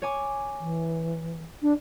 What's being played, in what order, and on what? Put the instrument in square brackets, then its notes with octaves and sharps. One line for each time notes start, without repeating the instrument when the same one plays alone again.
[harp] C#5 G#5 D6
[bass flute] E3
[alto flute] D4